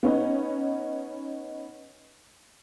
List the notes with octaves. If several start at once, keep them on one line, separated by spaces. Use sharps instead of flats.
B3 C#4 D#4